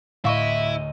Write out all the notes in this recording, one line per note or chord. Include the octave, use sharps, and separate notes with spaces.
D2 A2 E4 D#5 F5 C#6 A#6